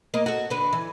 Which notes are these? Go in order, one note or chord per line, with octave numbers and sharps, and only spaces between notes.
A#3 D#5
F#4 A4
D3 B4
E3